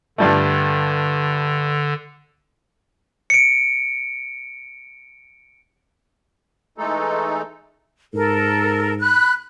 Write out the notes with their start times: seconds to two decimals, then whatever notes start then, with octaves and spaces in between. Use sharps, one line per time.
0.18 G2 D3 G3 A3
3.30 C#7 D7
6.78 E3 G#3 A3 D#4 A4
8.14 G#2 A4 A#4
9.00 B5 F#6